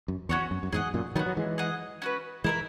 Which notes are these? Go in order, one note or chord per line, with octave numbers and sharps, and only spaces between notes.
F#2
E2 C#4 F#4 C#5
F#2
F#2
E2 G#2 G#4 D#5 F#5
F#2 A#2
D#3 F#3 B3 D#4 F#4
F#3
E3 G#3
G#4 D#5 F#5
C#4 F#4 B4
E3 G#3 E4 A#4 E5